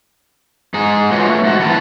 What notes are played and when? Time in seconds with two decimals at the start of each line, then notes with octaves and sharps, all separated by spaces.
0.74 G#2 D#4 G#4
1.12 G#3 A3 F4 F#4 B4 C#5
1.29 A3
1.44 G#2 F#4
1.59 E2 B3 E4 B4 A5